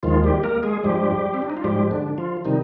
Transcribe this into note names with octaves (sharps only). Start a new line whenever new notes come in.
D#2 D#3 F3 G#3 F4
G3 G4
A#3 A#4
G#3 G#4
G2 F3 G3 G#3 G4
C4
D4
D#4
F4
G#2 F3 G3 G#3 G4
D3 D4
F3 F4
C3 D#3 G3 D#4